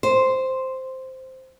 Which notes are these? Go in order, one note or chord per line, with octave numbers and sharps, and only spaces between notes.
C5